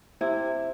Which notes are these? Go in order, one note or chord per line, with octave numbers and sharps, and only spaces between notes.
C3 E4